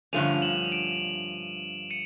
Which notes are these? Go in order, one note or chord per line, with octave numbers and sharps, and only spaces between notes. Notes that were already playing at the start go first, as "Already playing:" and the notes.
G2 D3 F3 A3 C#4 D#7 F7
E7 F#7
F7
D7 E7
C#7 D#7